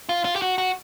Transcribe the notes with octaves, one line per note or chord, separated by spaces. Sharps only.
F4
F4
G4
F#4
F#4